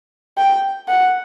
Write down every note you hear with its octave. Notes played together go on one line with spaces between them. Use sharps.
G5
F#5